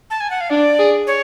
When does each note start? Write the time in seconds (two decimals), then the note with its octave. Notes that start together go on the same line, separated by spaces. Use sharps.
0.10 A5
0.20 G#5
0.30 F#5
0.41 F5
0.50 D4 D5
0.79 G#4
1.07 C#5